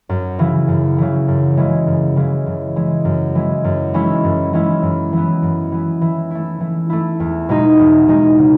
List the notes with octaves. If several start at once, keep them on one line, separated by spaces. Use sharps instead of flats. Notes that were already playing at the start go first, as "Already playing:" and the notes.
F#2
C#3 E3
F#2
C#3 E3
F#2
C#3 E3 G#3
F#2
C#3 E3 G#3
F#2
E3 G#3
F#2
E3 G#3
F#2
E3 G#3 C#4 E4
F#2
E3 G#3 C#4 E4
F#2
E3 B3
F#2
E3 B3
E3
A3 E4
E3
A3 E4
E2
B2 G#3 D#4
E2
B2 G#3 D#4
C#3